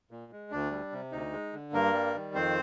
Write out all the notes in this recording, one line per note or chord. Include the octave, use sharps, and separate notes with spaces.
A#2
G#3
D2 D4
G3
C3
D2 D#4
G#3
D3
G2 A#3 A#4
G3
D#3
F2 C4 C5